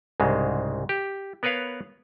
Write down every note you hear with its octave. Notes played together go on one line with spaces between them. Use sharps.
C2 G#2 C#3 G#3
G4
B3 A#4 B4 C#5 F5